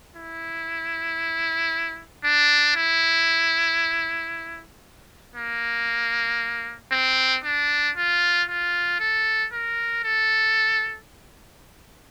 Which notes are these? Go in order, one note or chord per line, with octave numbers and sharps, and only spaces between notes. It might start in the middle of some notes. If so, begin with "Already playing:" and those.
E4
D4
E4
A#3
C4
D4
F4
F4
A4
A#4
A4